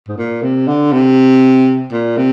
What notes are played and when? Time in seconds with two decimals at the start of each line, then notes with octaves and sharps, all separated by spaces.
0.08 G#2
0.18 A#2
0.42 C3
0.68 D3
0.93 C3
1.92 A#2
2.17 C3